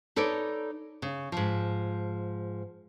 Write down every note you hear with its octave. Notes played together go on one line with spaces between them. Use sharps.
D#4 A4 B4 C#5 D5
C#3
G#2 F3